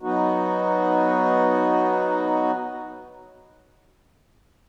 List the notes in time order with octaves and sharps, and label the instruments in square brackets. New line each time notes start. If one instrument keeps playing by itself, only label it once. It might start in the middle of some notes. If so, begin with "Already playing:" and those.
[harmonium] F#3 B3 D#4 F#4